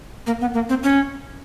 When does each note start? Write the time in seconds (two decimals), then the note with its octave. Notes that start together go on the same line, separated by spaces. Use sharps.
0.27 A#3
0.41 B3
0.54 A#3
0.69 C4
0.83 C#4